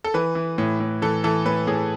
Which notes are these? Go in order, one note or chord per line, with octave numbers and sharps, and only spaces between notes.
A4
E3 B4
E3
A2
A2
E3 A4
E3 A4
A2 B4
A2 G#4